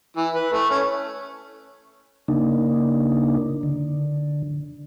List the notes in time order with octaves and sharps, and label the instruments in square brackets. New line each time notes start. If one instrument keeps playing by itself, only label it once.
[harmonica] E3
B4
A3
C#4
[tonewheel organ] C#3 A#3 D4 D#4
D3